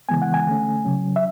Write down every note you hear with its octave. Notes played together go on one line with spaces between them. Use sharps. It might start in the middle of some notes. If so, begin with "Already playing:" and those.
C#3 E3 G#3 B3 G#5
F#5
G#5
D3 A3 C#4
C#3 F#3 C#4
E5